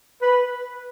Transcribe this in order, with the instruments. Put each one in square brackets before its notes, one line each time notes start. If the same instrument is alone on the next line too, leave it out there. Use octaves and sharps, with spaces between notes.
[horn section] B4